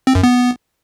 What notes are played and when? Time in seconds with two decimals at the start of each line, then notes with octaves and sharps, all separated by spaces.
0.07 C4
0.15 F#2
0.23 B3